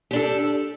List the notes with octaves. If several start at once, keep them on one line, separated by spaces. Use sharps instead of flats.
D4 G4 A4